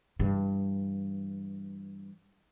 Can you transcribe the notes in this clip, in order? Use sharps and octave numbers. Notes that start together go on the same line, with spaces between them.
G2 E3